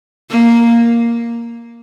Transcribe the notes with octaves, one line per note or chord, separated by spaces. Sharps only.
A#3